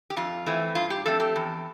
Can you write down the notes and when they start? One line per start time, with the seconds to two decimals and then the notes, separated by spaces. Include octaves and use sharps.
0.10 G4
0.16 F2 F4
0.46 E3 A3 C4
0.75 G2 F4
0.90 G4
1.05 F3 A3 C4 A4
1.20 G4
1.36 E2